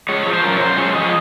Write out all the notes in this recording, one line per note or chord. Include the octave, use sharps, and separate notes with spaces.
G#3 C#5
F3
C5
F#2 A#4
C#5
F#2 C5
G#3 C#5
F3 D#5